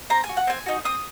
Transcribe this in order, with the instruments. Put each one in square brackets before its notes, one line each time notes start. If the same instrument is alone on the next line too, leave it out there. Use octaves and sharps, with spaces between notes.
[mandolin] C4 A#5
G#5
F#4
F#5
C4 G#5
D#4 F#4
C4 D#6